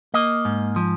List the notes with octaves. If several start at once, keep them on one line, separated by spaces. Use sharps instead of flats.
A#3 D#5
G#2
F3